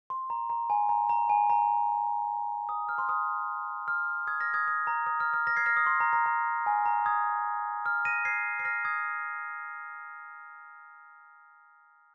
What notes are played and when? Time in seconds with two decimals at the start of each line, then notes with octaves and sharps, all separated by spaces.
0.10 C6
0.30 A#5
0.50 A#5
0.70 G#5
0.89 A#5
1.09 A#5
1.30 G#5
1.50 A#5
2.69 D#6
2.89 F6
2.98 C6
3.09 D#6
3.88 F6
4.27 D#6 G#6
4.41 F6 A#6
4.54 D#6 G#6
4.68 D#6
4.87 A#5
5.06 D#6
5.20 F6
5.34 F6
5.47 F6 A#6
5.56 G#6 C7
5.66 F6 A#6
5.77 D#6
5.86 C6
6.00 A#5
6.13 A#5
6.26 A#5
6.66 G#5
6.86 A#5
7.06 D#6 G#6
7.86 F6
8.05 A#6 D#7
8.25 G#6 C7
8.59 C7
8.65 F6 A#6
8.85 D#6 G#6